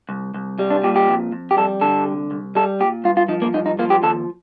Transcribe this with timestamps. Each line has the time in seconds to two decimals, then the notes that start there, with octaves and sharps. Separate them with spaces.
0.09 C2
0.34 C2
0.59 G3
0.70 D4
0.83 A#2 G4
0.96 G4
1.08 F2
1.32 F2
1.51 G4
1.57 G3 A4
1.81 D3 A4
2.06 C2
2.31 C2
2.55 G3 A4
2.80 A#2 G4
3.04 G2 F4
3.17 F4
3.28 F3 D#4
3.42 A#3
3.54 G2 D#4
3.66 D#4
3.79 F3 A#3
3.90 G4
4.03 D#2 A4